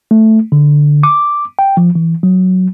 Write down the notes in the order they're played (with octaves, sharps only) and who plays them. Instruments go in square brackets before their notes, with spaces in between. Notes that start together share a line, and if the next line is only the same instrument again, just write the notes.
[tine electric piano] A3
D3
D6
G5
F3
E3
F#3